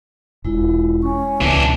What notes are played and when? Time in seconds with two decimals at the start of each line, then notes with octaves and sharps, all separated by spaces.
0.45 E1 G#3 E4 F4
1.02 C#4 C#6
1.25 G#3
1.42 C#2 B2 E3 D4